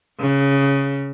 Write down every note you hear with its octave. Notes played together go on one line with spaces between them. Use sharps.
C#3